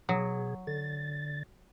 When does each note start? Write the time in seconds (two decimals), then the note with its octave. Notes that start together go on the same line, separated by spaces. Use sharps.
0.09 B2 F#3 G#4
0.67 D3 A6